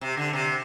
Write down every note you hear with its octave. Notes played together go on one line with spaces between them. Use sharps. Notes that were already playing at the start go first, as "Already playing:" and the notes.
C3
D3
C3